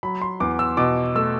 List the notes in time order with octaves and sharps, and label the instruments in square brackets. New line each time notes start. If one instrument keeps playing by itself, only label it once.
[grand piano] F#3 B5
C6
E2 D6
E6
B2 D6
A3 E6